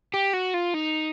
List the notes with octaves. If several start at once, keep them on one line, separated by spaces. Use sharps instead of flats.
G4
F#4
F4
D#4